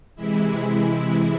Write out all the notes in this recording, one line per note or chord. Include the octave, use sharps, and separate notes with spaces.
C3 E3 G#3 E4